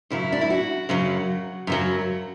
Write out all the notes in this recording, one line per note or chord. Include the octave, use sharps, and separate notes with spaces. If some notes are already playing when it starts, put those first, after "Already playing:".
F#2 C#3 F#3 E4
D4
E4
F#4
F#2 C#3 F#3
F#2 C#3 F#3